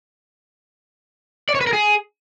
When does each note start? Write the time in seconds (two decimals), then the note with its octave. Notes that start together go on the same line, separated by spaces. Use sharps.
1.49 D5
1.55 C#5
1.61 B4
1.67 A#4
1.73 G#4